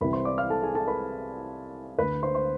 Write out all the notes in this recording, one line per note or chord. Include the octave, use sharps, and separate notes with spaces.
C2 C3 E3 B4 B5
C5 C6
D5 D6
F5 F6
A4 A5
G#4 G#5
A4 A5
B4 B5
D2 D3 B4 B5
C5 C6
C5 C6